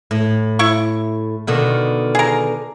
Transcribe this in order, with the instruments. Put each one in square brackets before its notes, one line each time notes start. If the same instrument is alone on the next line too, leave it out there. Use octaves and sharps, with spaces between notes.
[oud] A2
[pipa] E4 C#6
[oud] B2 D3 D#3
[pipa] G#4 A#4